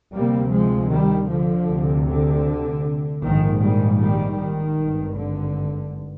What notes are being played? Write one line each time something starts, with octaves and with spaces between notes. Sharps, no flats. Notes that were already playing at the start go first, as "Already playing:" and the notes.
D2 C3 G3 A#3
F3 G#3
D#3 G3
D3 F3
D2 C3
D3
A#1 G#2 D#3
D#3 G3
D#3 G3
D#3
G#1 G2
D3